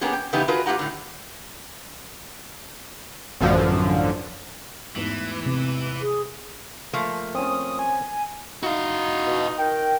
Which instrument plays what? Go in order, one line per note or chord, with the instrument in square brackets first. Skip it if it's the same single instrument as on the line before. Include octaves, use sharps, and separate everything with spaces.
[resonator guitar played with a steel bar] A#3 B3 C#4 G4 G#4
G5
C#3 E3 G#3 B3 D#4 G4
F4 F#4 G#4 A#4 B4
A#3 F4 G4 F#5 A#5
A2 D3
[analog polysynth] A1 F#2 D3 F3
[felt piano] A1 E2 G#2 [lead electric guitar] E3
[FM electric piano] C3
[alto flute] G#4
[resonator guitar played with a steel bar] F3 A3 A#3
[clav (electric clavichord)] C4 C#4 [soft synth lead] D#6
[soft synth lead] G#5
[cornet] D#4 [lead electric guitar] F#4 F5
[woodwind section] B2
D#3 A#4 G5